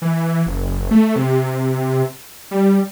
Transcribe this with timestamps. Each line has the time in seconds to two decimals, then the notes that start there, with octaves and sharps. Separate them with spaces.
0.02 E3
0.46 F#1
0.91 A3
1.16 C3
2.51 G3